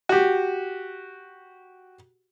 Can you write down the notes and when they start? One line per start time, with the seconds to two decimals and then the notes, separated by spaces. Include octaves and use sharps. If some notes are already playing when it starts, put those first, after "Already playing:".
0.09 F#4 G4